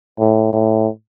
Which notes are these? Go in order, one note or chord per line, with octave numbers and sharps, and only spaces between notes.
A2
A2